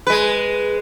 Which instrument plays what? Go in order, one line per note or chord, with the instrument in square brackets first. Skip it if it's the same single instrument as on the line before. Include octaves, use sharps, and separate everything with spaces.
[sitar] G#3 B4